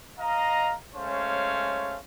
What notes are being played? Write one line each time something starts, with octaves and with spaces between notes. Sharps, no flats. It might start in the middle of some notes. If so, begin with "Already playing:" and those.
D#5 F5 A#5
G#3 A3 C#4 C5 C#5 F5